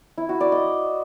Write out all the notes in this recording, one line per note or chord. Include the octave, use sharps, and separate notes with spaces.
E4
F#4
D5
D#5